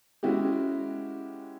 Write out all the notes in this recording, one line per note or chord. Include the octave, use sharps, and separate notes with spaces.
G#3 C#4 E4 F#4 G4